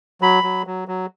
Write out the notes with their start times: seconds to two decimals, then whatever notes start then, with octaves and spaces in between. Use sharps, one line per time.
0.21 F#3 B5
0.43 F#3
0.67 F#3
0.88 F#3